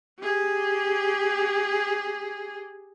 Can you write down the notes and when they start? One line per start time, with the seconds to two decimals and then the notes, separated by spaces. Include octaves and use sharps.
0.19 G4 G#4